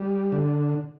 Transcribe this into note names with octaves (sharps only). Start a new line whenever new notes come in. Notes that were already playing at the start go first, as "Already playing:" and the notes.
Already playing: G3
D3